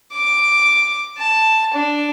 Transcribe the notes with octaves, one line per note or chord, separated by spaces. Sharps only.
D6
A5
D4